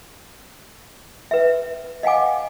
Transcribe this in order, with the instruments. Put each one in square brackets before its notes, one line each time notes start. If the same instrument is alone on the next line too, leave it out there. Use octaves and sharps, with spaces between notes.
[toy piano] B4 E5
D#5 F5 F#5 G#5 D6